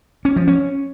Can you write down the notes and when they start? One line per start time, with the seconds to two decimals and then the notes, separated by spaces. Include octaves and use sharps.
0.25 C#4
0.36 F3
0.48 C#4